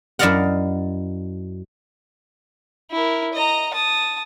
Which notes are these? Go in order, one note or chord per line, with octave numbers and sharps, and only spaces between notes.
F#2 E4 D5 D#5 F5 F#5
E4 A#4
D#5 A#5
A5 D#6